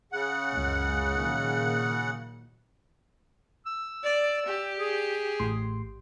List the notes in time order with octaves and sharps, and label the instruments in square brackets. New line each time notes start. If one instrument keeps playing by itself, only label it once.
[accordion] C#3 F#5
[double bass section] C#2 F#2 G#3
A#2 D#3 F#3
[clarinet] E6
[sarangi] D5
G4
[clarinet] G#4
[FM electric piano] A1 A2 C6